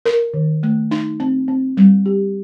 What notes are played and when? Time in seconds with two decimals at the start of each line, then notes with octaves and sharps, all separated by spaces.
0.05 A#4
0.34 D#3
0.63 A3
0.91 D#4
1.20 C4
1.48 C4
1.77 G3
2.06 G4